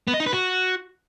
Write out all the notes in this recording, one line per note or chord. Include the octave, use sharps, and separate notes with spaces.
B3
D#5
D#4
B4
F#4